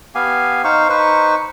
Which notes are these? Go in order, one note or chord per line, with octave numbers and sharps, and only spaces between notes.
B3 G4 F5 G#5
D#4 C5 F5 C#6
D#4 B4 C5 C#6